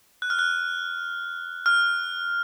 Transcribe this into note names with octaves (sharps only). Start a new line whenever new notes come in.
F#6
F6
F#6
F6